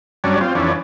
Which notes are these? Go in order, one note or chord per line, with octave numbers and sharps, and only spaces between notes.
G2 F#3 C#4 D4
C4 F4
F2 E3 C#4 D4